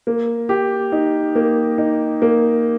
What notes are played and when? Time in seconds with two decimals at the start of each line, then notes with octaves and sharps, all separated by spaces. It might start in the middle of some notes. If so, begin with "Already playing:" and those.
0.07 A#3
0.49 G4
0.92 D#4
1.35 A#3
1.78 D#4
2.22 A#3